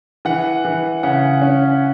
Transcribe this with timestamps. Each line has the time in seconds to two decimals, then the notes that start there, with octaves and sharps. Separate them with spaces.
0.25 E3 F#5
0.64 E3
1.03 C#3 F#5
1.42 C#4